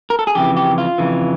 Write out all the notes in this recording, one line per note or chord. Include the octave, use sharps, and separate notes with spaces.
A#4
A4
G#4
F2 C#3 E3 G4
G4
F4
F2 C#3 E3